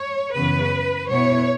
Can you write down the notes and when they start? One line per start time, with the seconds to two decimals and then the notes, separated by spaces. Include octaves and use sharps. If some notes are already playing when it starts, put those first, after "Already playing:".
Already playing: C#5
0.34 F#2 C#3 E3 B3 B4
1.09 B2 B3 E4 C#5